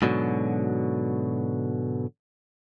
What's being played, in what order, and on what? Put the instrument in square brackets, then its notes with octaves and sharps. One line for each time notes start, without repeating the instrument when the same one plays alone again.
[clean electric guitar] G#2 B2 D3 F#3